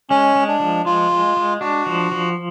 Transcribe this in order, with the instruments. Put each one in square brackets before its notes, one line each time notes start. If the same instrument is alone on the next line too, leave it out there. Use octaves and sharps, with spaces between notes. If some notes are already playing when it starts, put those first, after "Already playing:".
[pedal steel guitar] G#3 [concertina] C#4
[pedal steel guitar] G#3
[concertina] D4
[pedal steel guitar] F3
[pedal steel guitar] G#3 [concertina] F4
[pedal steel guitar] G#3
G#3
[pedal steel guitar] D4 [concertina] F#4
[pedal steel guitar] F3
F3